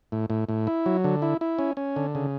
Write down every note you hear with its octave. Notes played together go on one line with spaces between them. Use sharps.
A2
A2
A2
E4
F#3
D3
E4
E4
C#4
C#4
D3
C#3